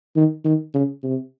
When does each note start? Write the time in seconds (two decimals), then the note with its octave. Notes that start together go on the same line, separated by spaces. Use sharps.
0.16 D#3
0.45 D#3
0.74 C#3
1.03 C3